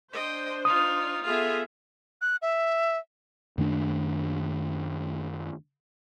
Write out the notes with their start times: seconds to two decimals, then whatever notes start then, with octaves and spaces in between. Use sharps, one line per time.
0.13 D4 C5 D#5 G5
0.65 D#4 F4 D#6
1.23 B3 F4 G#4 A4 E5
2.22 F#6
2.42 E5
3.58 F#2 D#3 A3 D4